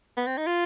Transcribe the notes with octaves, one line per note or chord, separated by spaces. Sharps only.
B3
C4
D#4
F4